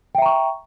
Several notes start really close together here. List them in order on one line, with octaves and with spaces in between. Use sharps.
G5 E5 A#5 C#6